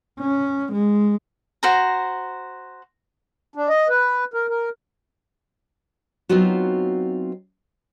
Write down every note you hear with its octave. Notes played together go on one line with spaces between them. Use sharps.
C#4
G#3
F#4 C5 A#5
D4
D#5
B4
A#4
A#4
F#3 B3 C4 D#4 F4 F#4